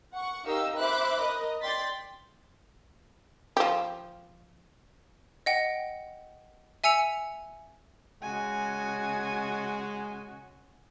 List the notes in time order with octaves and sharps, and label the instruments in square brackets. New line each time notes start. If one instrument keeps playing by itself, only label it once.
[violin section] F#5 C#6
D#4 G4 A#4 D#5 F5 E6
C5 E5 B5 D6 F#6
A#4 D#5
D5 G5 C6 A6 B6
[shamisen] F3 G4
[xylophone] D#5 F#5 G5
E5 G#5 E6 C#7 F7
[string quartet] C#3 F#4 [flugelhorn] G#3 [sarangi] G#5